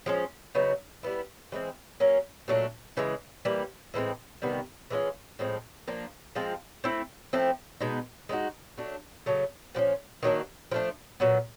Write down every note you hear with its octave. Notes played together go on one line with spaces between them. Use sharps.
F3 G#3 C#4
C#3 F#3 B3 D#4
G3 B3 E4
E3 G#3 C4
F#3 A#3 C#4
A#2 F#3 A3 D4
C#3 E3 G#3
E3 G3 A#3
A2 E3 G#3 C4
C3 D#3 G3 B3
E3 G#3 C#4 F4
A2 F3 G#3 C4
F3 A#3 D4
F3 G#3 C4 F4
A3 C4 E4
F3 A3 C4 E4
B2 G#3 B3 D#4
G#3 B3 D#4 F#4
F#3 A3 D4
C#3 F#3 A3
A#2 F3 A#3 C#4
D#3 F#3 A#3 D4
F3 A3 D4
A#2 F#3 B3